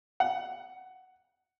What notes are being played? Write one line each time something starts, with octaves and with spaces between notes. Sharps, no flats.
F#5